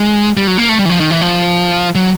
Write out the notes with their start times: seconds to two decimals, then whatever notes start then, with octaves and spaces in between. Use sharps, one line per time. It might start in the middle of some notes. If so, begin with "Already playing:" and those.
Already playing: G#3
0.37 G3
0.47 F#3
0.58 A#3
0.69 A3
0.79 G3
0.85 E3
0.90 F3
1.00 D#3
1.11 E3
1.21 F3
1.95 F#3